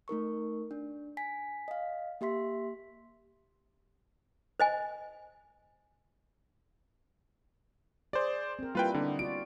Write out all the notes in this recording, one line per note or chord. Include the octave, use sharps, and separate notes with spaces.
A3 D#4 A#4 C#6
D4
G#5 B6
D#5 F5
A#3 G4 E5 C6 B6
C5 D#5 G#5
G#4 C5 D5
C4 A#4
G3 A#3 E4 F4 B4 G5
D3 B3 C4 D#4
F4 F#4 D5 D7